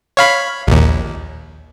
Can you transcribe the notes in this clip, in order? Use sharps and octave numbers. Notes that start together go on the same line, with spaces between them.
C#5 F5 B5
A#1 D#2